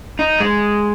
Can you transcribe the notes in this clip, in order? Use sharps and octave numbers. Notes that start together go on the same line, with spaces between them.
D#4
G#3